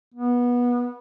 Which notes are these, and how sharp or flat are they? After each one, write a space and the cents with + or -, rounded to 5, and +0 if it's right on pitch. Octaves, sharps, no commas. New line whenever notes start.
B3 -20